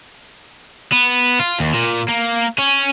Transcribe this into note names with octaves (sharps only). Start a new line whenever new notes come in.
B3
F4
D#2
A#2
A#3
C#4